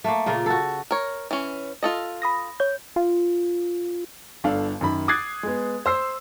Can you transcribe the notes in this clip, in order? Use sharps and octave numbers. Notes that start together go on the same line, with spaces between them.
A3 A#3
A#2 C#3 F4 A#4
F#4 A4
A#4 C#5
E3 C#4
F4 A4 D#5
B5 D#6 A#6
C#5 G6
F4
G1 D4 A4 F5
F#2 D#3 B5
D6 D#6 F#6 G#6 A6 C7
G#3 B3
C5 E6 C7